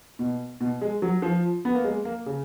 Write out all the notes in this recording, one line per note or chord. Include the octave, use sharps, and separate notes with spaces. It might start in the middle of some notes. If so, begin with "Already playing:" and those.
B2
B2
G#3
F#3
F3
B3
A#3
G#3
A#3
C#3